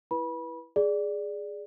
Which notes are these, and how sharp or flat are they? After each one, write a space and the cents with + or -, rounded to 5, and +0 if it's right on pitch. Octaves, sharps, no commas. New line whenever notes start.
E4 +0 B4 -15 B5 -25
G#4 +0 D5 +0